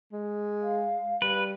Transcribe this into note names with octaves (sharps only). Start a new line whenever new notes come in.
G#3
F5
G3 B4